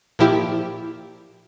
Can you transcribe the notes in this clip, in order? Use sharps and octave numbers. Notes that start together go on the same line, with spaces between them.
A#2 F3 E4 G4